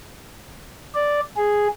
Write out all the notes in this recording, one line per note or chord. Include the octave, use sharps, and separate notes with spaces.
D5
G#4